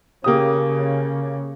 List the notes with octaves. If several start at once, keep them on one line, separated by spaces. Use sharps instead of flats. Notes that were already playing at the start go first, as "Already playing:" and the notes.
C#3 A#3 G4 D#6